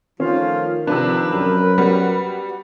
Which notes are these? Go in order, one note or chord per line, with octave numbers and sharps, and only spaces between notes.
D#3 F3 A3 C#4 F4
C3 F3 D4 A#4 B4
F#2
G3 B3 F#4